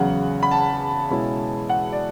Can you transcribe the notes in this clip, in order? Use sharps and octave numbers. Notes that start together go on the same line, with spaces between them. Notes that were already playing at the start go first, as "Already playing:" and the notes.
Already playing: E2 C#3 F#3 F#5
B5
A5
B2 G#3 C#4 E4
F#5
D5